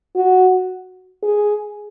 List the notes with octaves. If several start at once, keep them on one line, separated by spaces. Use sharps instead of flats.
F#4
G#4